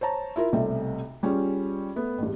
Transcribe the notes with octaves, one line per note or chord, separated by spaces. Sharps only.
C5 C#5 A5 A#5
E4 F4 A#4
B1 C3 G3 A3
G3 C#4 F4 G#4
A3 B3
A1 E2 G2